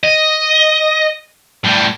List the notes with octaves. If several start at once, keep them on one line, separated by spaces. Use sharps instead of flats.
D#5
A2 G3